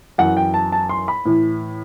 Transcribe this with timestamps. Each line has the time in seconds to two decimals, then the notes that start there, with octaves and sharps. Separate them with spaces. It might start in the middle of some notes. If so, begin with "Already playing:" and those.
0.18 F#2 E3 F#5
0.37 G5
0.54 A5
0.72 A5
0.89 C6
1.08 B5
1.25 A2 E3